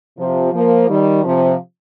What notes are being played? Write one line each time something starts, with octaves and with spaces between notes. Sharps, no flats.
C3 F3
F3 A#3
D#3 G3
C3 F3